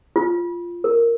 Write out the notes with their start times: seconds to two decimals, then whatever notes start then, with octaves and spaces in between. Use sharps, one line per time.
0.16 F4
0.84 A#4